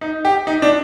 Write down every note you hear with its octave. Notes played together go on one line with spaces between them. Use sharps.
D#4
G4
D#4
D4